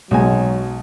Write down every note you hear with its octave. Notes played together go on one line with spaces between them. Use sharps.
B1 F#3 G#3 G#5